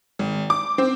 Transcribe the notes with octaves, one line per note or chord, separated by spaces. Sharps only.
G#1
D6
C4